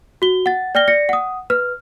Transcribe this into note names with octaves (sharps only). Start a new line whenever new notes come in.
F#4 G7
F#5 A6
D5 G5 F6 A#6 G7
D5 A#6 C#7
F#5 D#6
B4 F6